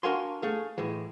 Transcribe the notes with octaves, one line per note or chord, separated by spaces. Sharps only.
D4 F#4 A#4 F5 G#5 C6
A3 G#4 F5
A2 E3 G#3